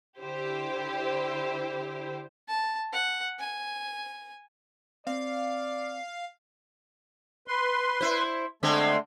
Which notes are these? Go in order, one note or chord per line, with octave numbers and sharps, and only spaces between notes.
D3 E4 G4 C5
A5
F#5
G#5
C4 D5 F5
B4 C6
E4 C5
D3 G#3 A3 C4